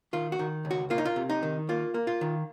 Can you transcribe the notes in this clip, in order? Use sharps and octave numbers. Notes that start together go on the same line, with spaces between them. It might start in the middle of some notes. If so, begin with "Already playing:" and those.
D#3 F4
F#4
D#3
C#2
F#4
A#3 F4
D#4
F4
C3
D#4
D#3
A#3 F4
A#3
F4
D#3